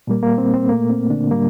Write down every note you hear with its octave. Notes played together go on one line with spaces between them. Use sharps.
A#2 G3 A#3
A#3
C4
C4
A#2 A3 A#3
C4
D3 D4
A2 G3 A#3